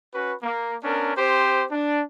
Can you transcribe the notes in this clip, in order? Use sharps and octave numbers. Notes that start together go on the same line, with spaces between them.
C#4 F#4 B4
A#3
B3 C#4 D4 A#4
C4 G4 C5
D4